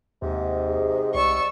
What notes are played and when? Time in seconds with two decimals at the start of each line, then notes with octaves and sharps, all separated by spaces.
0.22 D#2 G#2 C3
0.68 G#4
1.14 C2 D5 C#6 E6